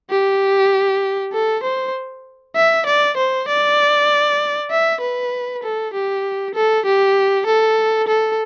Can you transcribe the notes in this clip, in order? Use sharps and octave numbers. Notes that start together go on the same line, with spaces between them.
G4
A4
C5
E5
D5
C5
D5
E5
B4
A4
G4
A4
G4
A4
A4